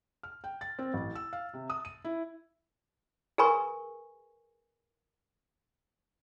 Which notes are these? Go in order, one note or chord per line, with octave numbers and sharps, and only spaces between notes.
F6
G5
A6
C4
A1
E6
F5
C3
D#6
D#7
E4
G#4 A#4 B4 G#5 B5 C#6